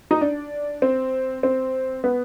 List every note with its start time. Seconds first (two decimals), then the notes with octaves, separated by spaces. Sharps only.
0.11 D#4
0.21 D4
0.82 C4
1.43 C4
2.04 B3